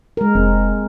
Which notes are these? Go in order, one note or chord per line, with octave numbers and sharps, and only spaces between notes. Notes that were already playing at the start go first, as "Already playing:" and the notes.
G#3 A#4
F1 C4